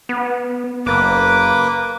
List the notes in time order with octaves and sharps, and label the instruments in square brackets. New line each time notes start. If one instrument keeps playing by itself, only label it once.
[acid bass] B3
[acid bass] F#1 [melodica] A#3 B4 D6